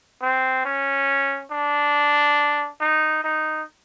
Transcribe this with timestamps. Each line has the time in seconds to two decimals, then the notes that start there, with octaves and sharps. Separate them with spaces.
0.22 C4
0.65 C#4
1.52 D4
2.81 D#4
3.24 D#4